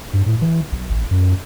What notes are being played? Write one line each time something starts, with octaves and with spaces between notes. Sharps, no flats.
G2
A2
E3
B1
A1
F#2